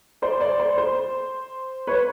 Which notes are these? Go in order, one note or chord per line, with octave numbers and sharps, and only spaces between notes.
C5 D5
C5 D5
C5
C5
B4 C#5